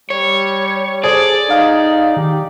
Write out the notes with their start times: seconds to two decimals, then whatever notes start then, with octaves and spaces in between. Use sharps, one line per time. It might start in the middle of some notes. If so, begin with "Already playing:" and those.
0.10 G3 C#5
1.04 G#4 A4 C5 D5
1.50 D#4 F5
2.17 D#3 G4